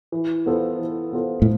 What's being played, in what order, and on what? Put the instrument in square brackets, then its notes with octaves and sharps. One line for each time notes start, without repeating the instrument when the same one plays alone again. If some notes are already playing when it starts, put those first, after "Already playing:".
[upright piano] E3
B3 F4 A4 C5
E3
B3 F4 A4 C5
[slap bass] A2